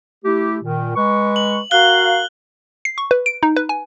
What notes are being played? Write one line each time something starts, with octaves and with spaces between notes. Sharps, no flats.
A3 E4 G4
A#2 D#3
G#3 B4 C#6
F#7
F#4 A#4 F5 F#6 G7
C7
C#6
B4
D7
D#4
B4
G#5